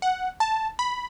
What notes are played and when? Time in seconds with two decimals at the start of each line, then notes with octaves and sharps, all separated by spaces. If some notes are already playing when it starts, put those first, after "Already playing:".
0.02 F#5
0.40 A5
0.79 B5